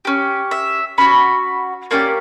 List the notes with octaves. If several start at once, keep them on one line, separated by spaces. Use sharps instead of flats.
C#4 G4
E5
C#4 F#4 B5
A#3 C#4 G4 D5